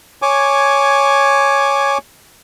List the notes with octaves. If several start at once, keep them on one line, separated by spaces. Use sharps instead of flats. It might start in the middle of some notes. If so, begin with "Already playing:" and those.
C#5 G#5 D6